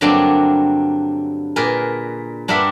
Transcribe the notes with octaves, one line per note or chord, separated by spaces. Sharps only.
G2 D3 F#3 A#3 C4 D4
A#2 G#4 A#4 B4
G2 D4 A#4 E5 F#5 B5